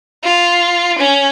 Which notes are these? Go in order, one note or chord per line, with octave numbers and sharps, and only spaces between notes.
F4
C#4